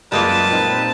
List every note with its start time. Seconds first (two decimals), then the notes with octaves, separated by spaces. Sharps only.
0.12 F#2 G3 G#3 A#3 F4 B4 A5
0.48 A#2 C4 D#4